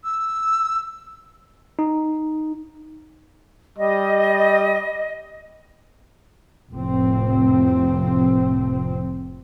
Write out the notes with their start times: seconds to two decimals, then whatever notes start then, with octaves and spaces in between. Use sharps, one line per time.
0.04 E6
1.79 D#4
3.78 G3 D#5
6.71 F1 A2 C3 F3 C4